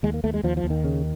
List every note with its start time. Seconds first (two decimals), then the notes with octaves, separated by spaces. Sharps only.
0.03 D#2 G#3
0.14 A#3
0.24 D#2 A3
0.34 G#3
0.43 D#2 F3
0.57 F3
0.64 D#2
0.70 D#3
0.84 C#3